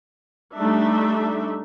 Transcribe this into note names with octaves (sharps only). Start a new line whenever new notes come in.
G3 A3 D4 D#4 E5